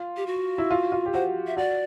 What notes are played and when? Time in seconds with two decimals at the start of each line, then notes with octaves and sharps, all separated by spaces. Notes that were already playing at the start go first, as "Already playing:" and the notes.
Already playing: F4
0.17 G4
0.27 F#4
0.58 E4
0.71 F4
0.92 F4
1.06 G4
1.13 F#4 C5
1.47 E5
1.57 F#4 D5